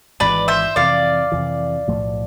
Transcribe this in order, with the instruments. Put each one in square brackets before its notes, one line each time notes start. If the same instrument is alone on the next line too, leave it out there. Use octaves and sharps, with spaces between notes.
[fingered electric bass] G#1 G#2 E3 [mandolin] B4 D5
[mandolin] C5 E5
[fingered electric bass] F2 C3 E3 [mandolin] D5 F5
[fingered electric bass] F2 C3 E3
B1 A2 F3 A3